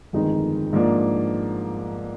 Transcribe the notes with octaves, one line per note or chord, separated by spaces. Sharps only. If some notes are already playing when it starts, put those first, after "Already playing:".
G1 F2 D#3 G#3 D#4
G#2 F3 A#3 D4